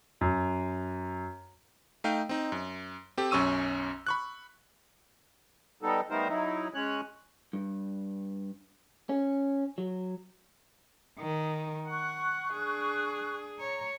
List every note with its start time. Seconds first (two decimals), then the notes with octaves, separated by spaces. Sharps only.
0.21 F#2
2.04 A3 D#4 F5 G5
2.29 C4 D#4
2.52 F#2
3.18 C4 G4 A4
3.31 B1 F#2 C#4 C#6 E6 D#7
4.07 B5 C#6 F#6
5.83 G3 B3 D#4 A4
6.10 G3 A3 B3 D#4 A#4 C5
6.29 F#3 D#4 E4
6.74 G#3 C#4 C#5 F#6
7.53 G2
9.09 C#4
9.78 F#3
11.19 D#3
11.88 F#5 C#6 F#6
12.51 D4 G#4
13.59 C#5 A#5